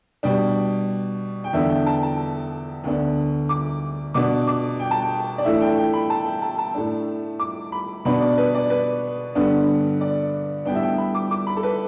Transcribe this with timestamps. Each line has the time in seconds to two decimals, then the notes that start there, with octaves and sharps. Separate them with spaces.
0.23 B2 G3 D4 G5
1.44 G5
1.53 E2 D3 B3 D4 E5
1.69 G5
1.86 A5
2.03 A5
2.84 D2 D3 B3 D4
3.49 D6
4.14 B2 B3 D4 D6
4.47 D6
4.80 G5
4.91 A5
5.02 G5
5.38 D5
5.45 A2 E3 A3 D4 E5
5.61 G5
5.77 G5
5.93 B5
6.10 A5
6.26 G5
6.42 A5
6.58 A5
6.74 A2 A3 D4
7.40 D6
7.72 B5
8.05 B2 B3 D4 B5
8.21 D5
8.38 B4
8.55 D5
8.70 B4
9.35 G2 D3 G3 B3 D4
10.01 D5
10.66 A2 G3 B3 D4 G5
10.75 E5
10.82 G5
10.98 B5
11.15 D6
11.31 D6
11.47 B5
11.57 A4
11.63 B4